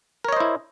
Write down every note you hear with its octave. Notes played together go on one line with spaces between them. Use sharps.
E4 A#4 C5 C#5 D#5